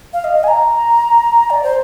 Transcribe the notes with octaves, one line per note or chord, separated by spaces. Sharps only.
F5
D#5
D#5
G#5
A#5
D5
C5